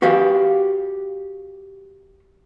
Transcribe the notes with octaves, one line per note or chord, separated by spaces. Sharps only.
F#4 G4 B4 F5